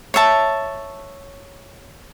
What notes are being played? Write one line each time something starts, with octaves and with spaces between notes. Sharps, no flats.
C#5 E5 A5